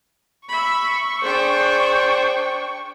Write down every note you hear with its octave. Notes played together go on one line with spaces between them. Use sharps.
E5 B5 C#6
D4 G#4 C5 G5